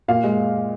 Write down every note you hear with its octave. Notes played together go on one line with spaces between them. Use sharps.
A#2 F5
G#3